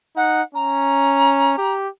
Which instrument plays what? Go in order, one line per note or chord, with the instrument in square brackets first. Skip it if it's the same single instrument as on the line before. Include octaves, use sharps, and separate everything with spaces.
[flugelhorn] D#4 [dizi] F#5
[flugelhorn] C#4 [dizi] A#5
[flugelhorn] G4